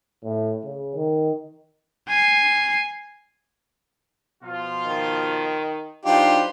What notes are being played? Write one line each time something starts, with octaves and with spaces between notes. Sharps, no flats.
A2
C#3
D#3
G#5 C7
B2 F3 F4
D#3
F#3 D4 D#4 F4 G4 B4 C5